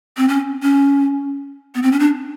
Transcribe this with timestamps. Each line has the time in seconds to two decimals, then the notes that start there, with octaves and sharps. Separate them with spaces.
0.17 C4
0.28 C#4
0.63 C#4
1.75 B3
1.82 C4
1.92 C#4
1.99 D4